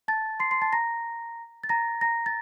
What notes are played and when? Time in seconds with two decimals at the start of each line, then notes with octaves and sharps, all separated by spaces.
0.08 A5 A6
0.40 C6 C7
0.51 C6 C7
0.62 A5 A6
0.73 A#5 A#6
1.64 A6
1.69 A#5 A#6
2.01 A#5 A#6
2.26 A6